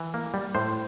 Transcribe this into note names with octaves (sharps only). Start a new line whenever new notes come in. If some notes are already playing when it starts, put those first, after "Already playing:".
Already playing: E3
A#3
G3
A2 C5